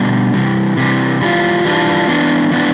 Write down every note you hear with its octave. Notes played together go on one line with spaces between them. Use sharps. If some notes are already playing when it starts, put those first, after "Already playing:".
Already playing: B2 G3 B3 D4
C3 E3 G3
C3 E3 G3
E3 G3 D4 F4
E3 G3 D4 F4
E3 B3 D4
E3 B3 D4